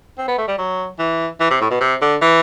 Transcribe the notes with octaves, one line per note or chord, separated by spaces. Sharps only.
C4
B3
A3
G3
F#3
E3
E3
C3
A2
B2
C3
D3
E3